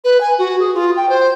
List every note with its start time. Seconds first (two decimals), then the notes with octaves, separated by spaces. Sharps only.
0.04 B4
0.21 G#5
0.38 F#4
0.60 G#4
0.74 F4
0.96 G5
1.09 C5